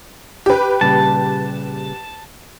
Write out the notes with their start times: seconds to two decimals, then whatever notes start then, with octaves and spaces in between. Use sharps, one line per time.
0.46 G4 B4
0.81 A#2 C#3 G3 A5